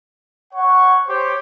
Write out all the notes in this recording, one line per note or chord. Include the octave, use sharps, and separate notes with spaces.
C#5 F#5 C#6
G4 C5 C#5